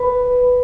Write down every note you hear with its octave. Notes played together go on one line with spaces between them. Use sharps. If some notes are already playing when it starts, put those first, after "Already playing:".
Already playing: B4